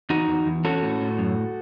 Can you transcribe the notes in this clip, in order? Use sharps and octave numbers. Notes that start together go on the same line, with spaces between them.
E2 D#4 F#4
E2
E2
C#4 F#4 A4
A2
A2
F#2